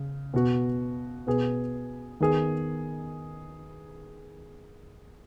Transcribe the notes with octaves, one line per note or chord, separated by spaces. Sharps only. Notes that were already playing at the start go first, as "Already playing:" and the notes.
Already playing: C#3
B2 B3 F#4
B2 B3 G#4
D#3 B3 G#4